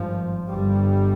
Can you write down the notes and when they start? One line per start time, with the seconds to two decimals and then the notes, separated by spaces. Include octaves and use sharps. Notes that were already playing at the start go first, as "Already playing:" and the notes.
Already playing: G#1 G2 F3
0.49 G1 G2 G3